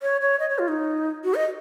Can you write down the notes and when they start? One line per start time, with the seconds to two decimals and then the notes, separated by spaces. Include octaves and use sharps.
0.02 C#5
0.21 C#5
0.40 D#5
0.50 C#5
0.59 F4
0.68 D#4
1.24 F#4
1.35 D#5